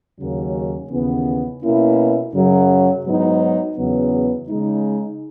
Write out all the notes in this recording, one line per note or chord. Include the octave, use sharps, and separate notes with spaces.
D#2 C#3 F#3 A#3 C#4
D#2 C#3 E3 B3
B2 A#3 C#4 E4
F#2 C#3 F#3
G#2 F#3 B3 D#4
E2 C#3 F#3 B3
C#3 G#3 D#4